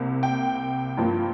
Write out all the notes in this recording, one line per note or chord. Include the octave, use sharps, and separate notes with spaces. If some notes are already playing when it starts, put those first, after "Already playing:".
Already playing: C2 C3 A#3
G5
G2 F3 A#3 F4